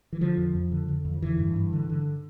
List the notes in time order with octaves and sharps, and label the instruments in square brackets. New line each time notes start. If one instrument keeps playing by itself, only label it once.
[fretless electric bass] E3
D3 F3
F2
F2
D3
D3
F2
F3
D3 E3
G2
G2
D3
D3